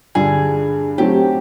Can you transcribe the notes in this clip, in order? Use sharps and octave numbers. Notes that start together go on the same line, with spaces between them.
G2 D3 G3 G#4
F#3 A3 C4 G4